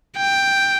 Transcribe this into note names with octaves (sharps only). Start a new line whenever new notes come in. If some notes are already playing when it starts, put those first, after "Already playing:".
G5